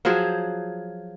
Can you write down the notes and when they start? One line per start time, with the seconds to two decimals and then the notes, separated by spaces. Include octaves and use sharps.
0.05 F3 F#3 G#4 C5